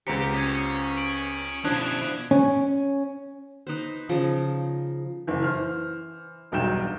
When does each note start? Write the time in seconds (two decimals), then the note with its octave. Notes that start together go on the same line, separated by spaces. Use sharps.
0.07 C#2 B3 C4 G4 A#5 B6 C#7
0.35 C#4 D#6 G#6
0.97 D7 F#7
1.65 B2 F3 C#4 D4 E4 D#6 F#6 G#6
2.31 C#4
3.67 D#4 B4 C5
4.09 C#3 F3 D#4
5.27 F#1 E3
5.43 E3 C5 F6
6.52 E1 B1 G2 G5 G6 E7